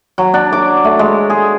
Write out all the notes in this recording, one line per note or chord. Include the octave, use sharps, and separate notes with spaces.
F#3
D4
D6
A3
G#3
G#4